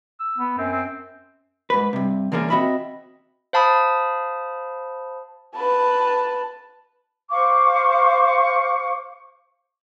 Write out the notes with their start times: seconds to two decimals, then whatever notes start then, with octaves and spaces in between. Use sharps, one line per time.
0.20 E6
0.38 B3
0.58 F#2 C4
0.72 C4
1.70 G#2 B4
1.93 G2 C3
2.32 E2 D3 A#3 C#4 D4 G#4
2.50 C4 F#4 D#5 E5 B5
3.53 C5 F5 A5 B5 D#6
5.56 B4 A5
7.31 C5 F5 C#6 D6